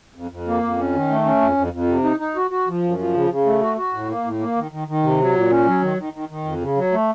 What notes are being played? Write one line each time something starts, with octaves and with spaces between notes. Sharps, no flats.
F2
F2
A#3
F2
C#4
D#3
A3
C#4
F2
F2
F2
C3
D#4
D#4
F#4
F#4
F3
F#2
F3
C#3
C#3
A3
F#4
F#4
A2
A#3
A2
A#3
D#3
D#3
D#3
C3
F#3
A#2
C#4
F#3
D#3
D#3
D#3
D#3
F2
C#3
F#3
A3